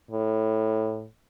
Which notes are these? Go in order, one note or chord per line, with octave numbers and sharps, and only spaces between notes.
A2